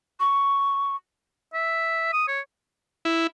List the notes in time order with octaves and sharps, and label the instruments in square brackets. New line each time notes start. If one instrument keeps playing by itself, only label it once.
[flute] C#6
[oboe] E5
D#6
C#5
[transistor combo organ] E4